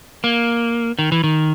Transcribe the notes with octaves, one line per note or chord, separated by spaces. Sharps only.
A#3
D#3
E3
D#3